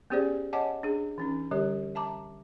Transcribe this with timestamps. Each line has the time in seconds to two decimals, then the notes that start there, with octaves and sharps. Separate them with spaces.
0.10 B3 C#4 G4 G#4 C5 D5
0.53 C#5 D#5 F#5 G#5 A5 D6
0.83 D4 G#4
1.18 E3 C#4 D#4
1.51 D3 G3 G4 C#5
1.95 E5 A5 A#5 D6